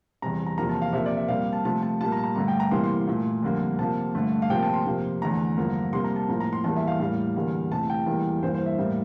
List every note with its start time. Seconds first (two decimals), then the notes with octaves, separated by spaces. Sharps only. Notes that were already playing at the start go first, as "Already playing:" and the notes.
0.22 E2 C3 G3 A#5
0.46 A#5
0.58 E2 C3 F3 A#3 A#5
0.69 A5
0.82 F5
0.93 C3 F3 A#3 E5
1.06 D5
1.17 E5
1.28 C3 G3 A#3 F5
1.53 A5
1.65 C3 F3 A3 A5
1.83 A5
2.01 A#2 G3 A#3 A5
2.12 A#5
2.24 A#5
2.36 G2 D3 A3 A#5
2.48 G5
2.60 A#5
2.71 C3 E3 G3 A#3 C6
2.84 C6
3.07 A#2 A3
3.43 F2 D3 G3 A#3
3.79 C3 F3 A#3 A5
4.15 G2 D3 A3
4.42 F5
4.50 C3 F3 A#3 G5
4.63 A5
4.74 C6
4.86 F2 C3 F3 A#3
5.21 E2 D3 A3 A#5
5.57 G2 D3 F3 A#3
5.93 C3 G3 A#3 C6
6.04 A#5
6.16 A5
6.29 A2 F3 A#3 A#5
6.40 A#5
6.53 C6
6.64 E2 E3 G3 A#3 A5
6.76 E5
6.87 F5
7.00 A2 G3 A#3 F5
7.36 E2 D3 G3 A#3
7.72 C3 E3 A3 A5
7.90 G5
8.06 E2 E3 G3 A#3
8.43 G2 E3 A#3 C5
8.54 C5
8.66 E5
8.78 A2 G3 A#3